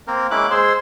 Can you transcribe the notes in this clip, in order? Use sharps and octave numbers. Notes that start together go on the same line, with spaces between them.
A#3 C4 A#4
G#3 A#3 C#4 E4 D6 F#6
G#3 G#4 C5 C6 E6